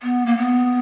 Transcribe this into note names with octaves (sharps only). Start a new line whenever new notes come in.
B3
A#3
B3